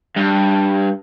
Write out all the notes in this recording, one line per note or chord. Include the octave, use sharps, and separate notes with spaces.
G2